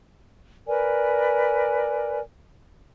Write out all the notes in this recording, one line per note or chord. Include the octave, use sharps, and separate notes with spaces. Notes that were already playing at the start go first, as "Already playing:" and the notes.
A#4 B4 D5 G#5